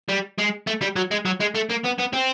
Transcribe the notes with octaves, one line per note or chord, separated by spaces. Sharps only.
G3
G#3
A3
G3
F#3
G#3
F#3
G#3
A3
A#3
B3
B3
C4